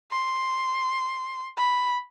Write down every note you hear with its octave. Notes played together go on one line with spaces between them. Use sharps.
C6
B5